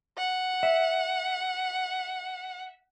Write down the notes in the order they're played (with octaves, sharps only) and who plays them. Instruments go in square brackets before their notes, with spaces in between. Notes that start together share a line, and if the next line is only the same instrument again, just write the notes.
[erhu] F#5
[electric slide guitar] E5